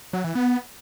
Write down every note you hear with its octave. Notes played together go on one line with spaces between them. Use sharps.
F#3
E3
B3